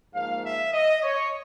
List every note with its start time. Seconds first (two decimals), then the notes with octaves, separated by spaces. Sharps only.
0.14 G#2 F3 A#3 F5
0.43 E5
0.73 D#5
1.03 C#5